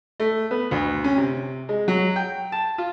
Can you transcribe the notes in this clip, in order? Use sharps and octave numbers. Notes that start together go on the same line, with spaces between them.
A3
B3
D2
C#4
C3
G#3
F#3
G5
A5
F4